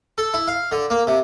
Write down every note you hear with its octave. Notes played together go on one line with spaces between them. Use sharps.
A4
E4
F5
D3
A#3
C3